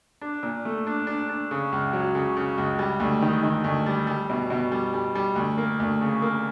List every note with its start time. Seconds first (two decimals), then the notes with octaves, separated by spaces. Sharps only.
0.22 D4
0.43 A#2
0.65 A3
0.87 D4
1.07 D4
1.29 D4
1.51 C#3
1.72 C#2
1.93 F#3
2.15 C#3
2.37 C#3
2.58 C#2
2.79 G3
3.00 D2
3.22 D#3
3.43 D#3
3.64 D2
3.86 G3
4.07 G3
4.30 B2
4.50 B2
4.72 G3
4.94 G3
5.15 G3
5.36 D2
5.57 A#3
5.80 D2
6.01 C#3
6.22 A#3